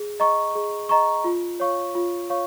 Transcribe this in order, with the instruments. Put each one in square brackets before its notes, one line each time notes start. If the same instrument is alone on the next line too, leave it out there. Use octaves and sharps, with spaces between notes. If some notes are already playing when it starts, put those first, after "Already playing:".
Already playing: [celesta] G#4
D#5 A#5 C#6
G#4
D#5 A#5 C#6
F4
C#5 F5 C#6
F4
C#5 F5 C#6